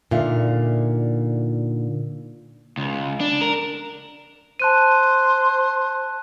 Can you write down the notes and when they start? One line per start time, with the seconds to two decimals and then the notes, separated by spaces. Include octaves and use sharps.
0.11 A#2 D3 D#4 E5 F5
2.77 C#2
3.20 D4
3.42 A#4
4.59 C5 A5 F#6 D#7